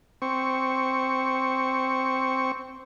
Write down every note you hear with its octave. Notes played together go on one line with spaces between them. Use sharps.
C4 C#6